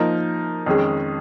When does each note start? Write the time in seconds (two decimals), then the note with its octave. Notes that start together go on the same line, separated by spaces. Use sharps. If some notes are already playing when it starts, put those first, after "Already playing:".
Already playing: F3 A#3 D#4 A#4
0.66 F2 D#3 G#3 C#4 G#4